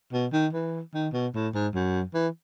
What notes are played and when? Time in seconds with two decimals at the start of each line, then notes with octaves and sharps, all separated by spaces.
0.13 B2
0.33 D#3
0.53 E3
0.94 D#3
1.13 B2
1.35 A2
1.54 G#2
1.74 F#2
2.14 E3